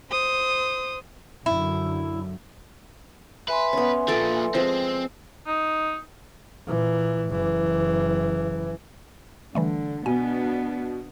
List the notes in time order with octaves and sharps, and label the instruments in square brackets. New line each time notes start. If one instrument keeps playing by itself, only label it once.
[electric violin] C5 D#6
[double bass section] F#2 D3 [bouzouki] E4
[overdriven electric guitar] B4 [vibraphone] E5 G#5 C6
[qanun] B3 C#4
[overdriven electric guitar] A#2 F3 [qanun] A4 D5
[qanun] F3 G#3 [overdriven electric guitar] C4
[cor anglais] D#4
[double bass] A#2 E3
F#1 E3
[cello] D3 [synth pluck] E3 G3 A3
[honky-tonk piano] B2 [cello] B3 D4 [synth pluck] G#5